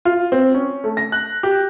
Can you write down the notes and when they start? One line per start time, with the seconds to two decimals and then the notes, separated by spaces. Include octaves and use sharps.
0.05 F4
0.32 C4
0.54 C#4
0.84 A3
0.97 A#6
1.12 F#6
1.43 G4